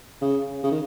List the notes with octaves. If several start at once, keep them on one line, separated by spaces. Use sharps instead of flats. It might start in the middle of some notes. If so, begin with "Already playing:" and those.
C#3
C#3
D#3